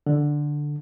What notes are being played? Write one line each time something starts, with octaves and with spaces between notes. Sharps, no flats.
D3